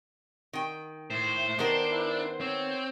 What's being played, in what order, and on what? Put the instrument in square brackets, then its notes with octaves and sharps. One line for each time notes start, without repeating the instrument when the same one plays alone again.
[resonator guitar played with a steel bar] D#3 G5
[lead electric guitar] A2 [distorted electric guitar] C5
[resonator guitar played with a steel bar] D#3 B3 A#4 [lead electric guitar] D4
[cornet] E4
[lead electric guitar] C4 [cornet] C#5